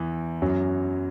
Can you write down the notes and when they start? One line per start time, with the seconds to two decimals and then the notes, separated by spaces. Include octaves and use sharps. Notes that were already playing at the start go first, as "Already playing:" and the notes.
Already playing: E2 E3
0.42 F#2 F#3